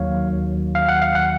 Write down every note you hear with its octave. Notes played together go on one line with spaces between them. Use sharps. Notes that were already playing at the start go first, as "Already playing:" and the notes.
Already playing: D#2 D#3 F#3 C#5 F5
F5
F#5
F5
F#5